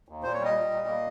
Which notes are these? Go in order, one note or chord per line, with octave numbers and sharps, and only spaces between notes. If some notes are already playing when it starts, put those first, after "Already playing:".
D#2
A#2 C5
C#5
G3
D#5
G3
A#2
A#3